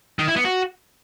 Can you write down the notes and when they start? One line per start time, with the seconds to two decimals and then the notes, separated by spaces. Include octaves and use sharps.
0.19 D#3
0.28 E4
0.36 B3
0.45 F#4